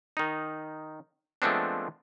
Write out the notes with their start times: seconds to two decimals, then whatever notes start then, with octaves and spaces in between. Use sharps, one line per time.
0.17 D#3 D#4
1.42 F3 G#3 A3 B3 C4 D4